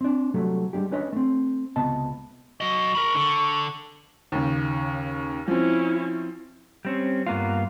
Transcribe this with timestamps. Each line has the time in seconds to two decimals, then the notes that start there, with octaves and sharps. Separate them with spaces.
0.01 C4 D4
0.34 C3 F#3 G3 A3
0.73 G3 G#3 A#3 D4 G4
0.91 C#4 D4 B4 C#5 D#5
1.13 A3 C4
1.76 C#2 C3 B3 D#5 A5
2.61 F#3 D#5 C#6
2.95 A#4 B5
3.15 D3
4.32 D#2 C#3
5.48 F3 C4 C#4 E4
6.85 G3 C4 C#4
7.27 G2 A#3 B3 F4